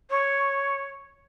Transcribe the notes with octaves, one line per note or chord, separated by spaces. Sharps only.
C#5